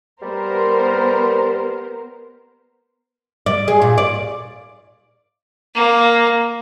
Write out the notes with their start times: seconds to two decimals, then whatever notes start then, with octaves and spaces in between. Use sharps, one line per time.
0.22 G3 B3 A#4 C5
3.46 D5
3.68 G#4
3.82 A#2
3.98 D5
5.75 A#3